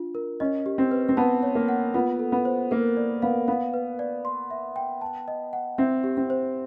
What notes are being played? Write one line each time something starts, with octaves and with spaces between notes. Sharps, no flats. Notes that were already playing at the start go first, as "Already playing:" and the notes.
Already playing: D4 F4
A#4
C#4 D#5
G4
C4
B4
C4
B3 A5
C#5
A#3
F#5
B3 F4
A4
B3
C5
A#3 A#4
D5
B3 F5
B3 F5
B4
D5
C6
E5
G5
A5
D#5
F#5
C4 E5
G4
C4
C5